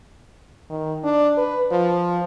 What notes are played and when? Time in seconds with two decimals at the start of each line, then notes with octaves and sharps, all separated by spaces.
0.70 D#3
1.04 D4
1.38 B4
1.71 F3